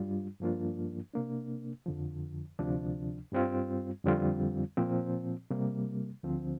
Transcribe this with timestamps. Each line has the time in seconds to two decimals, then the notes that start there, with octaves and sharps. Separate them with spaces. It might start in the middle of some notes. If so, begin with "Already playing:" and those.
Already playing: G2 G3 D4 F4
0.40 G2 F3 A#3 D4 F4
1.14 C3 A#3 D4
1.86 F2 D3 F3
2.59 D2 C3 F3 D4
3.32 G2 G3 C4 F4
4.05 F2 D3 G3 C4 F4
4.77 A#2 F3 C4
5.50 C3 G3 A#3
6.23 D2 D3 F3 C4